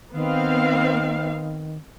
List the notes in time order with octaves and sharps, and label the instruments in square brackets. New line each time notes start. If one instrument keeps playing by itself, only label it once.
[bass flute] D#3 [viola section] B3 C4 F5